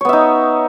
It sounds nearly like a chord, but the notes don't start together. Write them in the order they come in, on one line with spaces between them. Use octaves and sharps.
C#5 B3 E5 D#4